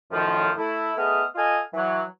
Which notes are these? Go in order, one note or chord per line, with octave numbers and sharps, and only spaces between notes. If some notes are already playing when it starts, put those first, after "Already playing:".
F#2 A2 D#3 F3
A3 E4
A3 B3 G#4 D#5 F6
F4 A4 D#5 F5 G#5
E3 F#3